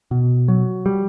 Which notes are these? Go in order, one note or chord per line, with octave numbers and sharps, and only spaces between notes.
B2
F#3
G3